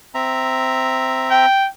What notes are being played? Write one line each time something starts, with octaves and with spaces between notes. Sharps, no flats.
C4 E5 A#5
G5